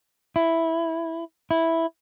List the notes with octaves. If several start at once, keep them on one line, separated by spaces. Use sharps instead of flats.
E4
E4